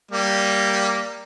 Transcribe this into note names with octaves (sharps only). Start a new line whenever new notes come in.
G3 A#3